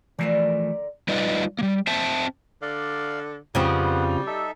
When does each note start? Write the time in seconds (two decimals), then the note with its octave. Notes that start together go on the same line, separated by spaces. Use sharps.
0.19 D3 E3 F3 A3 A#4 D5
1.08 G3 D#4 F4 B4 D5 D#5
1.59 G3 A#3
1.87 C4 C5 E5 A5
2.62 D3 D5 F5
3.55 F2 C#3 F3 G3 B3 C4 F5 F#5
4.27 D#4 A4 E5